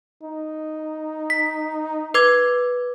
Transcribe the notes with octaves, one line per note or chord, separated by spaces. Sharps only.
D#4
B6
B4 D6 G#6